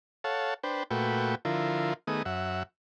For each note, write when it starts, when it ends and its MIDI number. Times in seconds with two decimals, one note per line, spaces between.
0.24 0.54 69
0.24 0.54 73
0.24 0.54 77
0.24 0.54 78
0.24 0.54 81
0.63 0.83 62
0.63 0.83 71
0.63 0.83 72
0.63 0.83 79
0.91 1.35 46
0.91 1.35 57
0.91 1.35 66
0.91 1.35 71
0.91 1.35 79
1.45 1.94 50
1.45 1.94 53
1.45 1.94 64
1.45 1.94 65
1.45 1.94 70
2.07 2.22 51
2.07 2.22 57
2.07 2.22 59
2.07 2.22 68
2.07 2.22 87
2.25 2.63 42
2.25 2.63 76
2.25 2.63 78